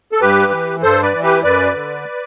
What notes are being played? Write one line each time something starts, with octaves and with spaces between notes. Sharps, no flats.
A4
G2 G4 B4
E3
G2 A4 C5
B4 D5
E3
G4 B4
F#2 B4 D5
D3